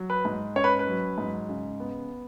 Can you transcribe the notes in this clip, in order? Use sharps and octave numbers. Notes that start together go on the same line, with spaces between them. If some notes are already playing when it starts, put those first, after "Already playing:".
Already playing: F#3
B4
G#2
C#4 C#5
B4
B4
F#3
G#2
C#3
B3